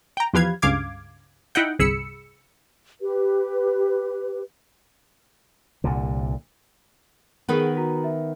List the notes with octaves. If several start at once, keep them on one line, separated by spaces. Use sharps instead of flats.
G5 A#5
E2 F3 G4 B4 F5 G#6
C#2 G2 C#3 F5 D6 G#6
D#4 E4 D#5 F#5 G5
G1 C2 G#4 B5 E6 C#7
G4 B4
C2 A#2 D3
D#3 B3 G#4 A#4 B4 F#5
F#4 A#5
E5